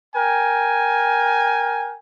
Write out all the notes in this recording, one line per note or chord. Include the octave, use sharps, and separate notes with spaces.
A#4 G5 G#5